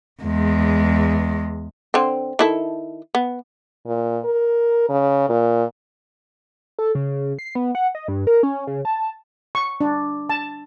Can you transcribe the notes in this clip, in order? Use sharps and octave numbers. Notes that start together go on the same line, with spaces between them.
E2 G#3
D3 C4
D#3 E4 A4
B3
A#2
A#4
C#3
A#2
A4
C#3
C7
B3
F#5
D#5
G2
A#4
C#4
C#3
A5
C#6
D4
A5